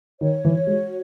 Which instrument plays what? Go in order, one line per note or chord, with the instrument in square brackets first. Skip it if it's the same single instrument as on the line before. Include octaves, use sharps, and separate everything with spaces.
[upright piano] D#3 [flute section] C#5
[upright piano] E3
[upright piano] G#3 [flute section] F#4